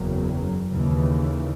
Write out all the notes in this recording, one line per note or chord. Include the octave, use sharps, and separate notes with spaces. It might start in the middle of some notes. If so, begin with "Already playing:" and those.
Already playing: F#1 E2 C#3 F#3
D#2 C#3 E3